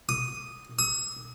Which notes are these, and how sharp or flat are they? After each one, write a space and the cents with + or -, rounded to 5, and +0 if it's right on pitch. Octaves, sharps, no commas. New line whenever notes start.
D#6 +0
D#6 +40